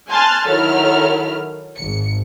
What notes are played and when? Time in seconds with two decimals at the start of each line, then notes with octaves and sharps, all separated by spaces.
0.10 G#5 A5 C6 F6 F#6 A6
0.48 D#3 F#3 E4 A4 F6
1.77 G#1 C#7